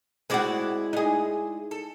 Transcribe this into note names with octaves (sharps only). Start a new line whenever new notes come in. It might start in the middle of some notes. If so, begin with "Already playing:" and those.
G#3 C4 E4 F#4 D5
D#4 G#4
A4